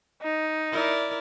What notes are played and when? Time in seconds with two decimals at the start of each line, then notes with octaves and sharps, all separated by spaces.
0.22 D#4
0.72 E4 A#4 D5